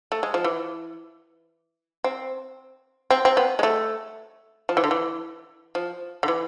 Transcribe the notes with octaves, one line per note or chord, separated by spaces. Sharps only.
A3
G#3
F3
E3
C4
C4
C4
B3
G#3
A3
F3
E3
D3
E3
F3
D3
E3